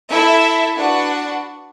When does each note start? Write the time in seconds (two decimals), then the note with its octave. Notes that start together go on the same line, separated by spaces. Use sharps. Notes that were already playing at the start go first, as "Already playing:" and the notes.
0.11 E4 A4 E5
0.77 D4 F#4 B4 F#5